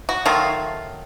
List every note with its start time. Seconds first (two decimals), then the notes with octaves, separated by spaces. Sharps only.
0.09 F#4
0.26 D#3 F#3 A3 F4